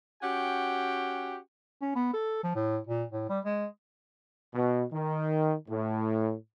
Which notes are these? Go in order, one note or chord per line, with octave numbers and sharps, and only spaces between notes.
C#4 F#4 G4 F#5 G5
C#4
B3
A4
F3
A2
A#2
A2
G3
G#3
B2
D#3
A2